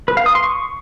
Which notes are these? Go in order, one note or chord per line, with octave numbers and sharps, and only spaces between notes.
B4
F5
D#6
C6
C#6